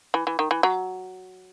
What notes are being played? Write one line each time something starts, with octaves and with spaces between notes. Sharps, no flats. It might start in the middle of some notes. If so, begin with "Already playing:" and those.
E3
E3
D#3
E3
F#3